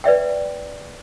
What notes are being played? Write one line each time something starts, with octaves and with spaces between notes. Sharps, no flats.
B4 D5 E5 G5